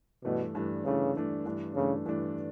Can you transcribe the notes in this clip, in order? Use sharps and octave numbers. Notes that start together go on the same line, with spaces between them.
G2 B2 E3 A3 D4
G2 E3 A3 D4
G2 C#3 E3 A3 D4
G2 E3 A3 D4
G2 E3 A3 D4
G2 C#3 E3 A3 D4
G2 E3 A3 D4